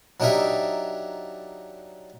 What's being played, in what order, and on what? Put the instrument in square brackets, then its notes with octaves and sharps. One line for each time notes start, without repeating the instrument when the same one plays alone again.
[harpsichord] F#3 D4 D#4 G4 A#4 E5